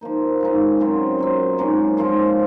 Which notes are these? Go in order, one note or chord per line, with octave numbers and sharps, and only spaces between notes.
F3 A#3 D#4
C#3 G#3 D#4
F#2 C#3 F#3 C4
A#2 F#3 C4
G#2 F#3 A#3 C#4
G#2 F3 A#3 F4